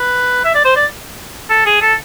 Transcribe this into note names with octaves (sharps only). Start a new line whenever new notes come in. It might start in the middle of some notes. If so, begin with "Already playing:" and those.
Already playing: B4
E5
D5
C5
D5
A4
G#4
A4